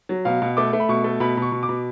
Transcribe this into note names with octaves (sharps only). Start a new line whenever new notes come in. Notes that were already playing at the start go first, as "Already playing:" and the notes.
F#3
B2 F5
B2
A3 D6
A3
B5
B2 C#6
A3
B2 B5
B2
C#6
B2
D6
B2